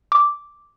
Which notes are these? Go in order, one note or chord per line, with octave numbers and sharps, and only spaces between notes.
D6